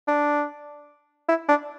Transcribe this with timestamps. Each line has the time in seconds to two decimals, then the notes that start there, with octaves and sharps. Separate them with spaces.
0.08 D4
1.29 E4
1.49 D4